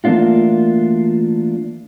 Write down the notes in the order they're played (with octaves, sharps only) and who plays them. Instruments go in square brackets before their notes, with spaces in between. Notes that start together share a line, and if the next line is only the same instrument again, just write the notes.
[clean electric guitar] E3 A3 A#3 D4 F4 F#4